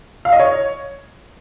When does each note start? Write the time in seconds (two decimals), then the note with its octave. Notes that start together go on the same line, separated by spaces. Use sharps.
0.25 F5
0.32 D#5
0.40 C#5